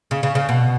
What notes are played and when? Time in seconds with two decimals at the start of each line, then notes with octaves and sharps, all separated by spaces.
0.11 C#3
0.23 C#3
0.35 C#3
0.49 B2